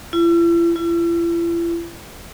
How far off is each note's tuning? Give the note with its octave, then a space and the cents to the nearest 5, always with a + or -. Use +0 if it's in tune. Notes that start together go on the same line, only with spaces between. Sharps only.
E4 +45
E4 +45